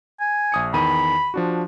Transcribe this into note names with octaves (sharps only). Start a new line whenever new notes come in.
G#5
A#1 D#6 C#7
E2 D#3 B5 D#7
F3 D4 F#4